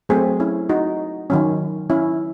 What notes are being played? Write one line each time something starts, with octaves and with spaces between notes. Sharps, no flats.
F#3 A3 C4 G#4 C5
C#4 E4
D#4 F#4
D#3 F#3 C#4
C#4 E4